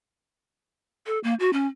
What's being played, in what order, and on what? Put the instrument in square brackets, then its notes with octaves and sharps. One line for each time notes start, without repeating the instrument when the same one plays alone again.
[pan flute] A4
A#3
F#4
C#4